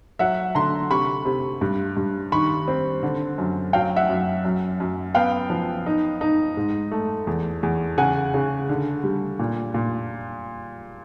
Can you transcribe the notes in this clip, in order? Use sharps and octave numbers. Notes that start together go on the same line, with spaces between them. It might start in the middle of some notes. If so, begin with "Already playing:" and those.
F#3 E5 F#5
D3 A#5 C6
C3 B5 C#6
C3
G2
G2
D#3 B5 C#6
C4
D3
F#2
F#3 F5 G5
E5 F#5
F#2
F#2
F#2
B3 F5 G5
F3
D#4
D#4
G#2
A3
E2
E2
C#3 F#5 G#5
C#3
D3
G3
A#2
A#2